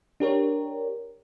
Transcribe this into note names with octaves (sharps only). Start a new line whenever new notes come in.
D4 G4 A#4 C#5